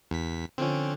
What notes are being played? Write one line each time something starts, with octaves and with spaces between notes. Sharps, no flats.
E2 B6
D3 F3 C4 C#4